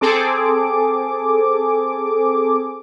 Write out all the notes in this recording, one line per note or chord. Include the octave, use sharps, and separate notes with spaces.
C4 G#4 A4 D6